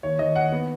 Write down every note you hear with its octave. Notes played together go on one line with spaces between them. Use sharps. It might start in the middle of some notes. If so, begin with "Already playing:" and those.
D#2 C#5
D#2 D#5
D#2 F#5
B3